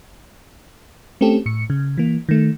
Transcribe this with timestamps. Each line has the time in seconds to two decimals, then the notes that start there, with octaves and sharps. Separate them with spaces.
1.21 A3 C4 C#4 G4 A4
1.46 A2 C#7
1.70 C#3
1.98 E3 A#3
2.29 D#3 A3